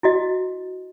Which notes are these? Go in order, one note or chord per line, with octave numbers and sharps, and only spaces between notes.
E4 F#4 D#5